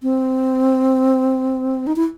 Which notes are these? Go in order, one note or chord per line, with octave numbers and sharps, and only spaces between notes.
C4
D#4
E4